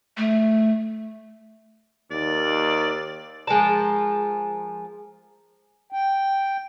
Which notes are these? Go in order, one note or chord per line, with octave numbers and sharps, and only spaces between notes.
A3
D#2 D5
F3 G#3 A#4 A5
G5